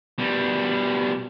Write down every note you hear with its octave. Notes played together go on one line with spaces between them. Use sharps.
B2 G3